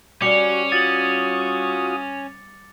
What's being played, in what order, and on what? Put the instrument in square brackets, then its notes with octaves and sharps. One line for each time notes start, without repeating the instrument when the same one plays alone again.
[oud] G3 [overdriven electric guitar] C#4 [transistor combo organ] F#4 [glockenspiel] D6 C#7 F7
[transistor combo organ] F4 F#4 D#6 [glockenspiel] A6 F#7